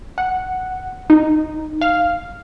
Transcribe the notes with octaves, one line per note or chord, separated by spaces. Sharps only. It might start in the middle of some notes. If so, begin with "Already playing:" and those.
F#5
D#4
F5